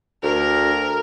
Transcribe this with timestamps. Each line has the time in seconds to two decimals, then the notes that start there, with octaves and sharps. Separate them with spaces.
0.23 D2 A#4